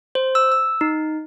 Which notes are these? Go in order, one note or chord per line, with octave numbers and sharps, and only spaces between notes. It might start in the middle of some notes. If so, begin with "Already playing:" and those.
C5
E6
E6
D#4